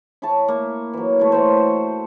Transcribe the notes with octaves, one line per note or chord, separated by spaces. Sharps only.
E4 C#5 A5
A#3
E3 F#3
A3 E4
C5 C#5 F#5 A5
F#4